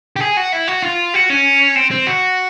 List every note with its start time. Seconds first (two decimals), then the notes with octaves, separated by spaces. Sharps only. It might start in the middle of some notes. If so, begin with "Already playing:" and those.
0.16 G4
0.20 G#4
0.37 F#4
0.53 E4
0.68 F#4
0.82 F4
1.14 F#4
1.30 C#4
1.76 C4
1.91 C4
2.07 F#4